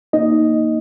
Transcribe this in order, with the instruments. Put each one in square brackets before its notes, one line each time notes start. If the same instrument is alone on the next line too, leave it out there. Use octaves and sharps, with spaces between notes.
[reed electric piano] A#3 D#4 D#5